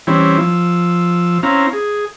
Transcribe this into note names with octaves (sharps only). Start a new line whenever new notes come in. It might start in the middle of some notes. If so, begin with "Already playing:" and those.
E3 G3 C4 C#4 E4
F3 E6
C4 C#4 E4 F5 A#5
G#4